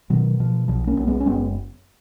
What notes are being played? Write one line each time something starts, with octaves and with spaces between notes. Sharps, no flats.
B2 D#3 F#3
B2 F3
B1 F3
A#3 C#4
B1
G#3 B3
C#4
F#1 G#3 B3